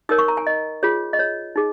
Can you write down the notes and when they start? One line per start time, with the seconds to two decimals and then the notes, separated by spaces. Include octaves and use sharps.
0.09 D#4 A#4 C#5 D#6
0.18 C#6
0.28 A#5
0.37 G#5
0.47 D#5
0.83 F4 G#4 C#5
1.13 D#5
1.19 C#5
1.56 D#4 G#4